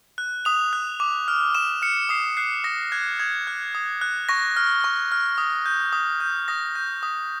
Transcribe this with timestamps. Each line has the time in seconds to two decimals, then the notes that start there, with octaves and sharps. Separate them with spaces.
0.18 F#6
0.45 D#6 F7
0.73 F#6
1.00 D6
1.28 F6
1.55 D6 E7
1.82 F6 C#7
2.09 D#6 C7
2.37 F#6 C7
2.64 D#6 A#6
2.92 F#6 G#6
3.19 D#6 G#6
3.47 F#6
3.75 D#6
4.01 F#6
4.29 C#6 A#6
4.57 F6
4.84 C#6
5.12 F6
5.38 D#6
5.66 G6
5.93 D#6
6.20 G6
6.48 D#6 A#6
6.75 G6
7.03 D#6